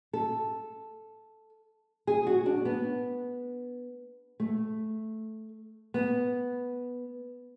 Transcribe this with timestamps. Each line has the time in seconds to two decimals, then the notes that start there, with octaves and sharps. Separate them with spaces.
0.13 A4
2.07 G#4
2.27 F#4
2.46 D4
2.65 B3
4.40 A3
5.94 B3